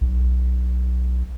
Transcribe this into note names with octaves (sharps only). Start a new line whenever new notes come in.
B1